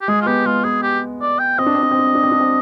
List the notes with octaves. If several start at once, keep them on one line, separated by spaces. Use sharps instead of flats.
G4
G#3 G#4
F4
B3 G4
G#3 F4
B3 G#4
G4
D5
G5
C4 D#5
D4
C4
D4
C4
D4
C4
D4
C4
D4
C4